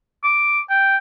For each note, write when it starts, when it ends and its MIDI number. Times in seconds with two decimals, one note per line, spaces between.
0.24 0.60 86
0.70 0.97 79